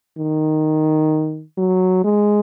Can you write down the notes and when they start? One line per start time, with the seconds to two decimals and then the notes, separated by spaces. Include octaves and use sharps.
0.18 D#3
1.58 F#3
2.04 G#3